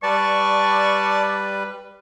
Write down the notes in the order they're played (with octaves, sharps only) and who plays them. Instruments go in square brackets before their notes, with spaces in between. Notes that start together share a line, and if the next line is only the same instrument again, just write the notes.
[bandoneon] G3 B4 [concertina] D5 A5 [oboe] C#6